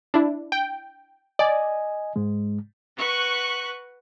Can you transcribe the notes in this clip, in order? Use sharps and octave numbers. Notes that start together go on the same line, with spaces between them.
D4 E4
G5
D5 D#5 G#5
G#2 G#3
F#4 B4 C#6 F#6